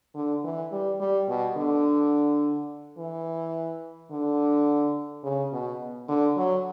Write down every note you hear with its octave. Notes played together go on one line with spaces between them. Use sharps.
D3
E3
G3
G3
B2
D3
E3
D3
C#3
B2
D3
F#3